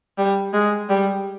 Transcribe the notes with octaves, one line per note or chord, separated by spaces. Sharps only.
G3
G#3
G3